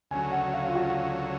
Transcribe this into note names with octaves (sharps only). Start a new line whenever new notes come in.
D2 C#3 F#3 G#5
F#5
F5
F4
F#4